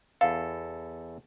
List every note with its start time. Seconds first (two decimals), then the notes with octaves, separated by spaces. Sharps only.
0.21 E2 A4 F5